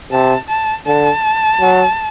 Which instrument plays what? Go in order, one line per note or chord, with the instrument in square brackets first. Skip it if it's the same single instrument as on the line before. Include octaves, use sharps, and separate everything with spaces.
[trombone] C3 [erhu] A5
[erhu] A5
[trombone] D3 [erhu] A5
[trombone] F#3